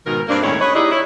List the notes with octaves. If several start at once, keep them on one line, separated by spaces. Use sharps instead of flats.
G#2 B2 D#3 A#4
G2 A#3 C4 D4
D#2 A2 G#3 C#4 E4 C#5
B4 C#5 D#5
D#4 E4 G4 G#4 D5 D#5
E4 C#5